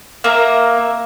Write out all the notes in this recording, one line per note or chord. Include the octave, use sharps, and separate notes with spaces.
A#3 E5 A#5